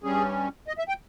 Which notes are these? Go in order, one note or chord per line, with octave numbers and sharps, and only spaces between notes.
G2 G3 C#4 G#4
D#5
E5
G5